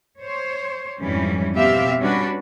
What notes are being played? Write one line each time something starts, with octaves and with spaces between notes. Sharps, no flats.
C5 C#5
F2 G#2 E3 G3 C#4
B2 C4 G4 E5 F5
G3 C#4 D4 F#4 B4